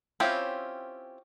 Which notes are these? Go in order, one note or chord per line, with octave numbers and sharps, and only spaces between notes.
C4 C#4 E4 F4 G4